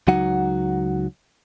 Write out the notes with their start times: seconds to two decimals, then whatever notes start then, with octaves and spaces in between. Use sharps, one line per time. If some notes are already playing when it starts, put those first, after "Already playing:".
0.08 C#2 F#3 D#4 F#4 F#5